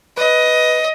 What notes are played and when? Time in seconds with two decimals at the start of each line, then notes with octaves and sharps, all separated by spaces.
0.17 B4 D#5